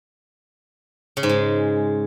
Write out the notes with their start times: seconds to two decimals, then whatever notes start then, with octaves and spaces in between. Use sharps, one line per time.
1.17 C#3
1.23 G#2
1.29 G#3